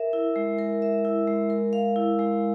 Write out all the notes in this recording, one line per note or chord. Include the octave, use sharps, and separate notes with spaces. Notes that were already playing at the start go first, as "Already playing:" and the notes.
Already playing: A#4 E5
E4
G#3
A#4
E5
E4
G#3
A#4
F5
E4
G#3